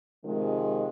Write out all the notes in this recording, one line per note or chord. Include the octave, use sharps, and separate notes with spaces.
C3 D#3 F3 G#3